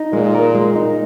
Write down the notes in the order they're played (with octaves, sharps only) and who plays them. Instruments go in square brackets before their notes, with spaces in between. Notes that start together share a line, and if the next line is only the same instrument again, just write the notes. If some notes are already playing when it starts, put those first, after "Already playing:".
Already playing: [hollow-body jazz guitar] D#4
[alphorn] A#2 [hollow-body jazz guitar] G#3
[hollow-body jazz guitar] A#4
G#3
D#4